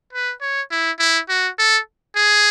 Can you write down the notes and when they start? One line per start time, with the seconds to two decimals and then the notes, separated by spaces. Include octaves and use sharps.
0.13 B4
0.41 C#5
0.71 E4
0.99 E4
1.29 F#4
1.59 A4
2.16 G#4